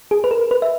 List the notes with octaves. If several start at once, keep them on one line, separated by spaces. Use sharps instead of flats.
G#4
B4
A#4
B4
E5